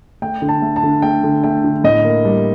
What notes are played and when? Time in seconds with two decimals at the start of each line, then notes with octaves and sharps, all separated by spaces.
0.22 A3 G5
0.42 D3
0.49 A5
0.62 A3
0.76 A5
0.83 D3
1.02 A3 G5
1.24 D3
1.44 A3 G5
1.64 D3
1.84 A2 D#5
2.04 A#3
2.25 G3